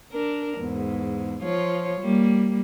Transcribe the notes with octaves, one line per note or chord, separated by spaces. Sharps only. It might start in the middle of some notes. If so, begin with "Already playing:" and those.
D4 A#4
E2 G#2
F3 F4 C#5
G3 A#3